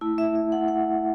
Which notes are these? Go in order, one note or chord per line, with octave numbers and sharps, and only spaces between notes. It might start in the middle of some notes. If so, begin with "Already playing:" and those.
A3 E4
E5
E5
F#5
F#5